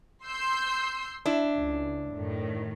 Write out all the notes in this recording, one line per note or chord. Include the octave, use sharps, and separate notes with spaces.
C6 E6 G6
D4 E4
C#2
F#2 A2 D#3